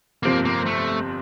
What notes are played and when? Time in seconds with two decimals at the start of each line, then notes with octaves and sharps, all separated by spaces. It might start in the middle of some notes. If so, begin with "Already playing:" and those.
0.23 G1 F2 C3 F3 A#3 C4
0.45 A#3
0.66 A3